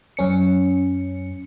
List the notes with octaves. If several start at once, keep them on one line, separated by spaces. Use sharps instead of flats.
F#2 C#4 C#7